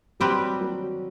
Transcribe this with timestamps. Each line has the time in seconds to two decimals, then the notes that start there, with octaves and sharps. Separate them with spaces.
0.20 F#3 G3 C4 G4 B4
0.61 F#3